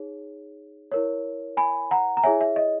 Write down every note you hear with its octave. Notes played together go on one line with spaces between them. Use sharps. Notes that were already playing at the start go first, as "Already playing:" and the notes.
Already playing: D#4 G#4 C#5
E4 A#4 C#5
G#5 B5
F#5 A#5
A#5
E4 G#4 C#5 E5 G#5
E5
D#5